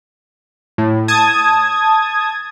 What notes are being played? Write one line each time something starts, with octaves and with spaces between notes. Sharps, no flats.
A2
A5 D#6 G#6